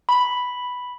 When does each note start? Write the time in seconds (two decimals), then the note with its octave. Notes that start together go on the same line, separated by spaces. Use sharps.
0.09 B5